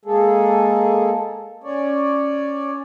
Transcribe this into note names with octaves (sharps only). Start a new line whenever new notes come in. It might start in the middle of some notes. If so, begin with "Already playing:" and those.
G#3 A#3 G#4 A4
C#4 C#5 D5